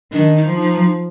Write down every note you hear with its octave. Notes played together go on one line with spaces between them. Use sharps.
D#3 D4
D#4
F3
D#4